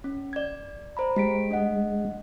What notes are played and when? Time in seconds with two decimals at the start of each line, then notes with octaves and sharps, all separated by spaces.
0.04 C#4
0.33 D5 G#6
0.97 C5 A#5 B5
1.16 G#3 G4 B6 D7
1.50 D4 D#5 F#5